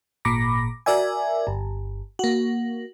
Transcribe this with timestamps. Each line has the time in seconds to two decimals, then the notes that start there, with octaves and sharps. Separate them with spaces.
0.25 G#1 A#2 B5 D6 A#6
0.86 F#4 A#4 D5 E5 G#5
1.47 G1
2.19 A#3 F#4